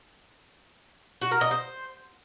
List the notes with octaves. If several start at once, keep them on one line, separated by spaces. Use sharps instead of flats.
F#4
A#4
D#5
C5